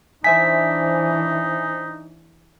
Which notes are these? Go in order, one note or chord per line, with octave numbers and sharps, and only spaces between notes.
E3 D4 D#4 C5 E5 G#5 B6